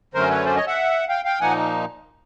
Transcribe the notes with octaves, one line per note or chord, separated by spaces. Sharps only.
F#2 D3 F#3 A3 C#4 A#4 C5
B4 C#5
C5 D5
C#5 D#5
E5 F#5
F5 G5
F5 G5
A#2 F3 A#3 D#4 F#5 G#5